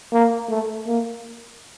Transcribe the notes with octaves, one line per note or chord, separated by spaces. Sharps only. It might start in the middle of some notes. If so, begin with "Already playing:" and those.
A#3
A3
A#3